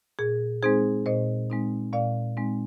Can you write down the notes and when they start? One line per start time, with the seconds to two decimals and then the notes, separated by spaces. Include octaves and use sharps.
0.19 A#2 G#4
0.63 G#3 C4 D#4 G#4 C5
1.06 A#2 C5 D#5
1.50 G#3 C4 D#4
1.93 A#2 D5 F5
2.37 G#3 C4 D#4